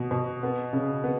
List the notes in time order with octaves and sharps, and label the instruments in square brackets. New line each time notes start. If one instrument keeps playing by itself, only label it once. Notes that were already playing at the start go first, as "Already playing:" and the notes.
Already playing: [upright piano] B2
B2
B3
C#3
B3